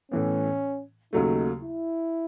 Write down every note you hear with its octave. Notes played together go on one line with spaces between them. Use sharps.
A2 E3 B3 C#4
D#2 C#3 F#3 A3 D#4
E4